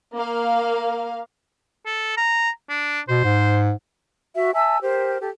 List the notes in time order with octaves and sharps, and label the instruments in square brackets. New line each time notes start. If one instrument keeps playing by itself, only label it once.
[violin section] A#3 F5
[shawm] A4
A#5
D4
[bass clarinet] B2 [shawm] C5
[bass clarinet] G#2
[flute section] F#4 E5
E5 G#5 A5 E6
G4 A#4 C5
G4 A4